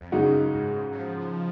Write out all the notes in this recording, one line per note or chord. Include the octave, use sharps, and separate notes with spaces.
F2
F#2 C#3 G#3 D#4 F#4
G#2
F#3
F3